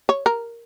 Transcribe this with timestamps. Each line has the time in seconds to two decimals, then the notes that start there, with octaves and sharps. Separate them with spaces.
0.09 C#5
0.26 A#4